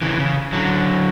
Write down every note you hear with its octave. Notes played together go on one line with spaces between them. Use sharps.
C#3 E3
C#3
D3 F#3